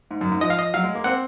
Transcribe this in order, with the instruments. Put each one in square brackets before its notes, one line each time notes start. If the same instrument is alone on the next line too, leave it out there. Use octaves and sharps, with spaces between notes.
[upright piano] G#2
F#2
G#2
[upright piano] F3 [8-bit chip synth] D#5
[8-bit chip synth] F5
D#5
[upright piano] F#3 [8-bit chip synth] F5
[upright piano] G#3
A#3
[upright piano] C4 [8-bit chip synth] F#5